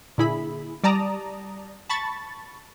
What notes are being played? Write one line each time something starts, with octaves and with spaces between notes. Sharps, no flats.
A#2 D3 E4 G#4 B5
G3 D5 A5 A#5 D#6
A5 B5 C#6 A6